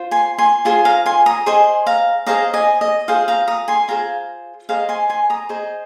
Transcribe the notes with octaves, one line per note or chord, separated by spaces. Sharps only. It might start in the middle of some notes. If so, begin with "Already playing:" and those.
Already playing: F4 C5
G#5 C6
G#5 C6
F4 G#4 C5 G#5 C6
F5 A#5
G#5 C6
A#5 D#6
G#4 C5 D#5 G#5 C6
F5 A#5
G#4 C5 D#5 F5 A#5
D#5 G#5
D#5
F4 G#4 C5 F5
F5 A#5
A#5 D#6
G#5 C6
F4 G#4 C5 F5 A#5
G#4 C5 D#5 F5 A#5
G#5 C6
G#5 C6
A#5 D#6
G#4 C5 D#5